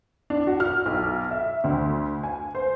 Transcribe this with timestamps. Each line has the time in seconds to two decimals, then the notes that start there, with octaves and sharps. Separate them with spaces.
0.30 D4
0.47 F#4
0.60 F6
0.86 B1
1.31 E5
1.64 D2
2.23 G#5
2.55 C5